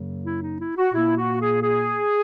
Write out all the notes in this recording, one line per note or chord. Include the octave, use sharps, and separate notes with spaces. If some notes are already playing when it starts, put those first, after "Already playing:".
Already playing: F#2 C#3 F#3 A#3
E4
D#4
E4
F#4
A#2 A#3 E4
F#4
G#4
G#4